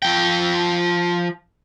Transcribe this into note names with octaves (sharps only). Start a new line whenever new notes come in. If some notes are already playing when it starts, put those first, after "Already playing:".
F3 G5